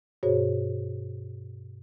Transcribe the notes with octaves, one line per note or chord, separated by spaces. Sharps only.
G2 B2 F#4 G#4 C5 C#5